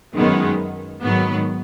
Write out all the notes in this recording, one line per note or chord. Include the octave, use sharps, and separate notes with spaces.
F#2 D#3 G#3 B3
G#2 D#3 F#3 B3